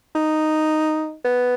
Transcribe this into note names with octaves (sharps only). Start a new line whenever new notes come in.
D#4
B3